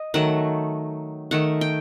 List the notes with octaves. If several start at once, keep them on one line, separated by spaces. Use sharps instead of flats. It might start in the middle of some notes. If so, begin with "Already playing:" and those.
Already playing: D#5
D#3 F#3 A3 F#5
D#3 A3 F#5
G5